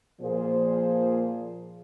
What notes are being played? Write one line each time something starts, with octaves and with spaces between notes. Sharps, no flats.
A#2 F3 A#3 G#4 C5